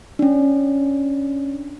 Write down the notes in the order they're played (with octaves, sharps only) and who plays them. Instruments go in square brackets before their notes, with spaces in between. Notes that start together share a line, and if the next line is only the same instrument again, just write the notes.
[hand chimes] C#4 D4